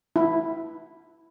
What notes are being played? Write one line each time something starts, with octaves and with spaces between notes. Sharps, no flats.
E4